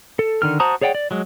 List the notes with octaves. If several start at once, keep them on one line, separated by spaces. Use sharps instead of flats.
A4
D3 D#3 F6
F#4 C5 A5 A#5 D#6
G#4 C#5 D5 F#5 G5
D5
F#3 G#3